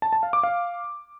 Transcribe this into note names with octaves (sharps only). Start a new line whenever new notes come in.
A5
A5
F5
D6
F5